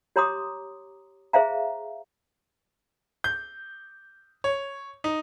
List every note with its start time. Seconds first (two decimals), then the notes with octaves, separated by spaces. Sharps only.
0.16 G4 C#5 A#5 C6 D6 D#6
1.33 G#4 C5 E5 F5 A#5
3.24 G6
4.44 C#5
5.04 D#4